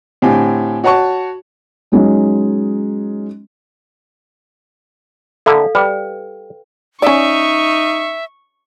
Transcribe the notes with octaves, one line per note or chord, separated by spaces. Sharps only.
A2 D3 C4 G4 G#5
F#4 C#5 F#5 A5 C#6
F#3 G#3 C#4 D#4
D3 A#3 E4 A4 D5 F5
G3 B4 G5
C#4 D#4 D5 E5 C#6